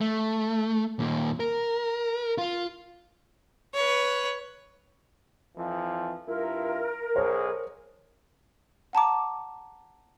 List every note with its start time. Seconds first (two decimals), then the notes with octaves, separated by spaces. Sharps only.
0.01 A3
0.99 D#2 A#2
1.40 A#4
2.38 F4
3.74 B4 C#5
5.56 F2 E3 F3
6.26 G2 E4 F4 A#4
7.16 B1 G#4 C5 C#5
8.93 F#5 A5 A#5 D6